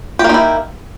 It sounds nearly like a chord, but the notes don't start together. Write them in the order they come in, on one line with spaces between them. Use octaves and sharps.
G4 A#3 D#4 E4